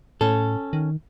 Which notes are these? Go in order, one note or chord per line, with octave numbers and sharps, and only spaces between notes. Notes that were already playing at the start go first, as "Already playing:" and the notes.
A2 C#4 A4
D#3